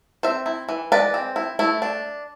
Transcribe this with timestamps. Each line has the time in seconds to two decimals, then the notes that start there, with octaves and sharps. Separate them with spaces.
0.23 C4 C5 E5
0.46 E4
0.69 E3
0.92 G#3 B4 D5
1.14 C4
1.36 E4
1.59 A3 E4
1.82 D4